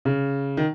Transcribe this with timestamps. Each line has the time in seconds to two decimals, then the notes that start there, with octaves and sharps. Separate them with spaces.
0.05 C#3
0.57 D#3